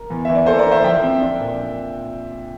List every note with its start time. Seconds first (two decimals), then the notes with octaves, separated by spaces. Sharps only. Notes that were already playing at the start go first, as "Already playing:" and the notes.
Already playing: A#4
0.10 E2
0.25 E3 E5
0.35 D5
0.46 A#3 A4 C5
0.59 A#4 D5
0.66 D4
0.71 C5 E5
0.84 F3 E5 G5
1.02 C4
1.21 D4
1.39 A#2